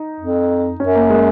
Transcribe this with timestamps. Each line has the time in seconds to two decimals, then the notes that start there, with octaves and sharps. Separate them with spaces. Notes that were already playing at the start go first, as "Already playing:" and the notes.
Already playing: D#4
0.20 F2
0.80 F#2 C#4
0.95 A#3
1.10 G#3